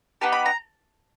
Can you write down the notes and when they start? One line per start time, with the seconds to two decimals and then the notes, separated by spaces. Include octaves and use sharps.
0.21 B3 D#4 G4 A5
0.32 B5
0.46 A#5